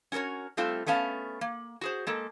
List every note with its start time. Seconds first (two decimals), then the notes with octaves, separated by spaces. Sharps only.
0.12 C#4 F#4 A4 A#4 C#5
0.57 G3 A3 C4 F4 A4
0.86 A3 B3 C#4 F5 A5
1.41 A#3
1.81 F#4 G#4 C5
2.07 G#3 A#3 A4